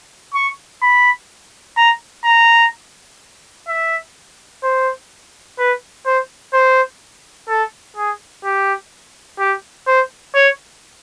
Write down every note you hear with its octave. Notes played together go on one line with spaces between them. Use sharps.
C#6
B5
A#5
A#5
E5
C5
B4
C5
C5
A4
G#4
G4
G4
C5
C#5